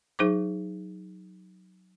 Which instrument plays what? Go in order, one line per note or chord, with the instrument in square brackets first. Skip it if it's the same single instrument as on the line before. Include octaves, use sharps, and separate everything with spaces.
[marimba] F#3 D#4 G#4 C5 D6